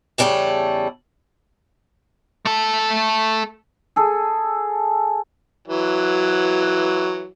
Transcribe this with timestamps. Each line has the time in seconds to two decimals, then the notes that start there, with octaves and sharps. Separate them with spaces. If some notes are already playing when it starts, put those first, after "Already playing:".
0.18 E2 C#3 G3 A3 A4 C#5
2.45 A3 A4
3.96 G#4 A4
5.68 E3 F#3